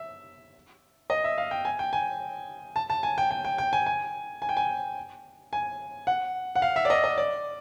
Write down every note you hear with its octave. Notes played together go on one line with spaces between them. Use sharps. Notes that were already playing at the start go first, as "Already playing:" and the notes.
Already playing: E5
D#5
E5
F5
G5
G#5
G5
G#5
A5
A5
G#5
G5
G5
G5
G5
G#5
G#5
G#5
G5
G#5
G#5
F#5
F#5
F5
E5
D5
D#5
D#5
D5